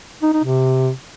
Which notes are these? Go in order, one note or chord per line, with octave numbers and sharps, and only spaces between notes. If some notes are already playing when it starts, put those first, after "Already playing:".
D#4
D#4
C3